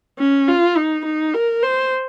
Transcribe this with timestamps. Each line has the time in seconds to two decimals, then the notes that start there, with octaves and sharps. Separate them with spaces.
0.19 C#4
0.48 F4
0.77 D#4
1.05 D#4
1.34 A#4
1.63 C5